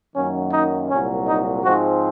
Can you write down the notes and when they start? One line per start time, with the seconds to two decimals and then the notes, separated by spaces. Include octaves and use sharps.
0.16 F#2 D#3 F#3 A#3 C#4
0.53 D#4
0.90 C2 A#2 F#3 C#4
1.28 D#4
1.64 G#2 F3 G#3 C4 F#4